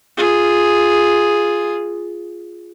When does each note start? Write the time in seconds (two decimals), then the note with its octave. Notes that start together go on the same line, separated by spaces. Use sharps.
0.17 F4 G#4